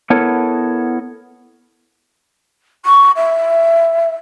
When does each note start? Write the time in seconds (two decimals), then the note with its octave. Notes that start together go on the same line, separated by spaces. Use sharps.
0.10 B3 E4 A4 A#4 C#5
2.85 C#6
3.16 E5